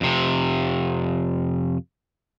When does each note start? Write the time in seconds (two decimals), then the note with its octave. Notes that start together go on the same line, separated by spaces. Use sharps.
0.01 F2 C3